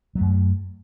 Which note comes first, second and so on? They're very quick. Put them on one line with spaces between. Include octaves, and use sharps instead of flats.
F#3 A3 F#2